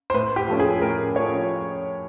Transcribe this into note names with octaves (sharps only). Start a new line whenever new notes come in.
C5
A2 B4
G4
F3 A3 C#4
G#4
A2 A#4
F3 A3 C#4 C#5